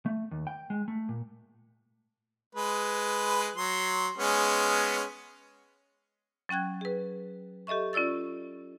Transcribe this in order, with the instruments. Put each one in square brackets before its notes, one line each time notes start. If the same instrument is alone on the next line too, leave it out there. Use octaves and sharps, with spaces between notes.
[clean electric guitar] A3
D#2
G5
G#3
A3
A#2
[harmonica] G#3 B4
F#3 C6
G#3 B3 C#4
[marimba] F#3 C#4 G5 F#6 G#6
G#4 B4
G4 A4 D#5 E5 C#6
C#4 F4 D5 E6 A6